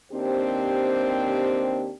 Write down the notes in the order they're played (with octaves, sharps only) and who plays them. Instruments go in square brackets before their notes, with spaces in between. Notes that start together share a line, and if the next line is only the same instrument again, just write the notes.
[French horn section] D#2 C4 D4 G4 C5